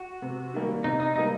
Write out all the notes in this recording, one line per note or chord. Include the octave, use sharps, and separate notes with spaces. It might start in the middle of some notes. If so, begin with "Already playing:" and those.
Already playing: F#4
C3
D#3 G3 A#3
C3 D#4
D#4
D#3 G3 A#3 D#4